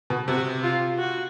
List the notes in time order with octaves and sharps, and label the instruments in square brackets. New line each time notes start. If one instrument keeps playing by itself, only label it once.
[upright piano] B2
[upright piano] C3 [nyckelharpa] F#4
[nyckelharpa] F4
F#4